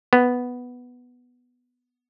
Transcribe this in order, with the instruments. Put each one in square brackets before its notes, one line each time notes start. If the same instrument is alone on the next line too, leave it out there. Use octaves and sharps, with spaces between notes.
[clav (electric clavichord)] B3